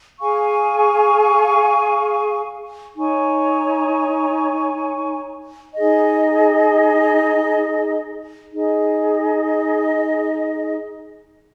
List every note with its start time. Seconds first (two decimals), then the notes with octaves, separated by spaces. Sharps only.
0.19 G#4 F5 G#5 C#6
2.96 D#4 C#5 G#5 C#6
5.75 D#4 G#4 D#5
8.52 D#4 G#4 D#5